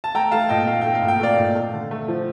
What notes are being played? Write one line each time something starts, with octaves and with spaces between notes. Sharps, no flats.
A5
A3 G5 A#5
A3 F5 A5
A#2 D#5 G5
A3 F5
A3 G5
F5
A#2
G5
A3 D5 F5
A#2
A3
D3
A3
F3